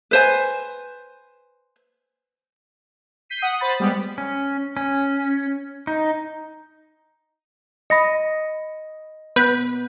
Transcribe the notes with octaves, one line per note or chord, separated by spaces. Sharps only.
B4 C5 G#5
G6 B6 C7 D#7
F#5 D#6
C5 B5 A6
G3 G#3 B3
C#4
C#4
D#4
D#5 B5 A#6 C#7
B3 B4 G6